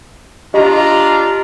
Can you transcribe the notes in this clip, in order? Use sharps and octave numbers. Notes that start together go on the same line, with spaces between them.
D4 F4 G4 D#5 A#5